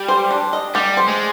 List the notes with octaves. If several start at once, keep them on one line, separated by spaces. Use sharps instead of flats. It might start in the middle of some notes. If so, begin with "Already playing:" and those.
Already playing: G3
C5
D4
D#5
G3 G4
C5
G#3